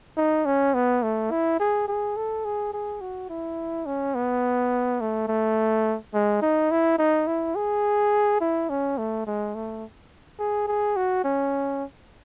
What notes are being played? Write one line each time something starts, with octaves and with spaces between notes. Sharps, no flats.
D#4
C#4
B3
A3
E4
G#4
G#4
A4
G#4
G#4
F#4
E4
C#4
B3
A3
A3
G#3
D#4
E4
D#4
E4
G#4
E4
C#4
A3
G#3
A3
G#4
G#4
F#4
C#4